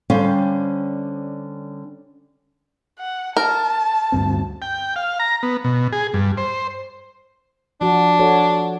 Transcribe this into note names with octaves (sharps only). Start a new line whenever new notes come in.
D3 G3 C#4 C5 F5 G5
F#5
A#4 A5
D2 G2 C4
G5
F5
A#5
B3
B2
G#4
G2
C5
F3 D4 F#4
F#4 A4 C#5